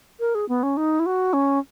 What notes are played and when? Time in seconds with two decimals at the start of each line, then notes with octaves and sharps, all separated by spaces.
0.20 A#4
0.35 G#4
0.49 B3
0.63 C#4
0.77 D#4
0.99 E4
1.06 F#4
1.33 C#4